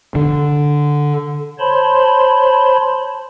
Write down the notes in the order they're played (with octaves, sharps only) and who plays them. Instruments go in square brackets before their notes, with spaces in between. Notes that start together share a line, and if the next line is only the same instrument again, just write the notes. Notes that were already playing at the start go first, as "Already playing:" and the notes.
[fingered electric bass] D3
[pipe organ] C5 C#5 A5 B5 C6